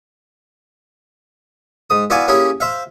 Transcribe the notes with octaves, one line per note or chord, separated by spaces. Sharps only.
G#2 D#6
B3 E4 F#4 D5 F5 G#5
A#3 C#4 E4 G4 G#4
C5 E5 F5